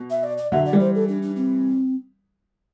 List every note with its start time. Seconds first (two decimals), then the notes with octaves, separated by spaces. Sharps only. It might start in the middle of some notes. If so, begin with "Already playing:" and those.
Already playing: B2
0.10 E5
0.23 D5
0.38 D5
0.52 D3 F#3 E5
0.66 D5
0.73 E3 G3
0.80 C5
0.95 A4
1.08 D4
1.22 D4
1.36 C4